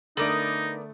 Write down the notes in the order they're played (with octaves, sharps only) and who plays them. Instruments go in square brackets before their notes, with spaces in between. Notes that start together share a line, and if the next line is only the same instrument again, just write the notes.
[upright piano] D3 A3 [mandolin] B3 A#4 D5 [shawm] D#4 [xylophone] A4 D#6